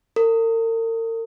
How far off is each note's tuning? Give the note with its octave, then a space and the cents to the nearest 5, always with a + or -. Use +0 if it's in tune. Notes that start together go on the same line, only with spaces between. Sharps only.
A#4 -45